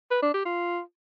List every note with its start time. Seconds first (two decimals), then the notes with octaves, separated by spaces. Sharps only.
0.11 B4
0.22 D4
0.34 G4
0.45 F4